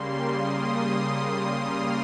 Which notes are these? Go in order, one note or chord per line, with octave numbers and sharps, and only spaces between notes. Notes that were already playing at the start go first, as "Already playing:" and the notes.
Already playing: C#3 G3 A#3 C6
D#6
F6